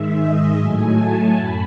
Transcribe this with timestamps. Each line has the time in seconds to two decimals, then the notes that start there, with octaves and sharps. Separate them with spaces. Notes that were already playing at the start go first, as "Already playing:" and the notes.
Already playing: G#2 D#3 G#3 E5
0.16 D#5
0.55 A2 F#3 A3 G#5
0.95 A5
1.36 F#2 B5